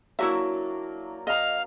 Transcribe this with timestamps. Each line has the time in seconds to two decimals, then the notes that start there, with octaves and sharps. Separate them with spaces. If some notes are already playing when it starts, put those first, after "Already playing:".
0.19 F#3 A#3 D4 E4 F#4 E5
1.27 D#5 F5 A#5